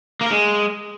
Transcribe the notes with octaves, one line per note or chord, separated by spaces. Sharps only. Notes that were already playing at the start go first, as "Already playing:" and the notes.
A#3
A#4
G#3